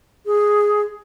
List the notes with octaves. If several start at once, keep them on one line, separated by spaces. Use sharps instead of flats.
G#4